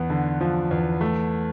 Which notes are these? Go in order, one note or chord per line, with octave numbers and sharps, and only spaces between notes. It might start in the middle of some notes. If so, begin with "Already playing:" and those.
Already playing: E2 B3
D3
F3
E2
A3